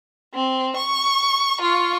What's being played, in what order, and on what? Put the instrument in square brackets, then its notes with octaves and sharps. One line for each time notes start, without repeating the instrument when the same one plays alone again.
[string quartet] C4
C#6
F4 C#6